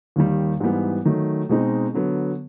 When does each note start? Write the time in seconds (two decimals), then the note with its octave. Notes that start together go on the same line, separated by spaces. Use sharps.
0.16 D#2 D#3 G3
0.60 G#2 E3 G3 B3
1.05 D#3 F#3 A3
1.49 B2 G#3 C4 D#4
1.94 D3 F#3 B3